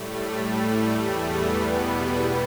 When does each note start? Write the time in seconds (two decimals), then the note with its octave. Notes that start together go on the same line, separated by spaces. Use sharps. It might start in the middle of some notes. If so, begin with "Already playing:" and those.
Already playing: A2 G3 A3
0.32 A2 G3 A3
0.93 E2 E3 G3 A3
1.24 B3
1.54 E2 B2 G3
2.14 G2 E3 G3 B3